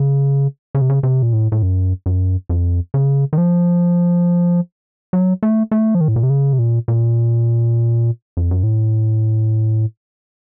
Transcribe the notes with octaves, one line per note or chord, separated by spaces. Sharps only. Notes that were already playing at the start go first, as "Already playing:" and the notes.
Already playing: C#3
C#3
C3
C#3
C3
A#2
A2
A2
F#2
F#2
F2
C#3
D#3
F3
F#3
A3
A3
F3
D#3
A2
A#2
C3
C#3
C3
A#2
A#2
F2
F#2
A2